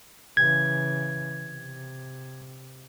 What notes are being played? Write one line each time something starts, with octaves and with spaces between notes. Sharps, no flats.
C#3 E3 G#6
C3